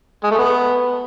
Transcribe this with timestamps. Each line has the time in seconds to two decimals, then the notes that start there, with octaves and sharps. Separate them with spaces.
0.23 G#3
0.31 A3
0.39 B3